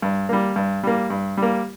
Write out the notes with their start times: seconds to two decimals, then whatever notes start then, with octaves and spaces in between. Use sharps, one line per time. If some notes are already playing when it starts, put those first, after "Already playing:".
0.02 G2
0.29 G3 A#3
0.56 G2
0.83 G3 A#3
1.10 G2
1.37 G3 A#3